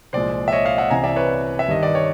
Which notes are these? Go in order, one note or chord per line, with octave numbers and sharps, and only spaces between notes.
C2 A#2 F3 G#3 C5 D5
E5
C#5 D#5
D#5 F5
E5 F#5
C2 C3 E3 G#5 A#5
D5 E5
B4 C#5
E5
G2 D#3 G3 D#5
D5
C#5